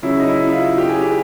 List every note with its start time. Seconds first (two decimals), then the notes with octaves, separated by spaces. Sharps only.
0.02 C#3 F#3 E4
0.20 D#4
0.28 E4
0.47 E4
0.52 F4
0.78 G4
0.89 G#4
1.01 G4